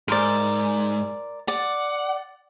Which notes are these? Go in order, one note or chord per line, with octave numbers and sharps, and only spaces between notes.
G#2 A#4 C5 D5
D5 F#5